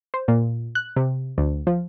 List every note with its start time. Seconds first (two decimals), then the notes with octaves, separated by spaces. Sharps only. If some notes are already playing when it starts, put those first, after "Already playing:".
0.14 C5
0.28 A#2
0.75 F#6
0.96 C3
1.38 D2
1.67 F3